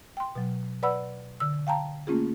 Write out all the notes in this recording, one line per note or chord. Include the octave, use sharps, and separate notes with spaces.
G5 C6
B2 F#3
B4 D5 F#5 B5 E6
D3 E6
F5 G5 A5 A#5
A3 A#3 C#4 F4 G#4